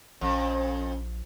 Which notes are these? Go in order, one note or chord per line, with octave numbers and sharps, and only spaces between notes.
A#1 F2 C#4